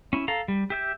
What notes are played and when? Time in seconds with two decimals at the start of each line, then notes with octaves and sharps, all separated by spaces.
0.13 C#4 E4
0.28 A4 F5 A#5
0.48 G3
0.70 G4 E5 G6